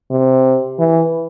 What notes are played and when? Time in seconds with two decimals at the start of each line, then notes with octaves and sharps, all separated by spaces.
0.11 C3
0.79 E3